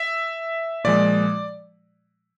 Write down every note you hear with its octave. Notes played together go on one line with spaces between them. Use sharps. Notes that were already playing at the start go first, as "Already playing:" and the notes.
Already playing: E5
A#2 F3 G#3 D5